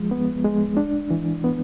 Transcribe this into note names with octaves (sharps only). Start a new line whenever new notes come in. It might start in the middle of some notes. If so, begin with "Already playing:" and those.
Already playing: F3 G#3
B3
G#3
D4
E3
B3